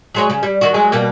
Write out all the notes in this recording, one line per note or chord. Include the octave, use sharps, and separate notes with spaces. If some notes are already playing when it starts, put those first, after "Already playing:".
F#3 G#3 C#5
C#3
G3
D#3 F#4
F#3 G#3 G#4
B2 G3 A#3